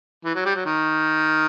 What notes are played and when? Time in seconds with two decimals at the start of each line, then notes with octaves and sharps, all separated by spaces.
0.25 E3
0.35 F#3
0.45 G3
0.56 F#3
0.66 D#3